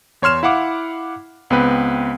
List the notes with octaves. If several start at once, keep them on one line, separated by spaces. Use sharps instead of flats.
E2 C#5 C6 F6 E7
E4 F5 F#5 D6
C#2 B3 C4 B4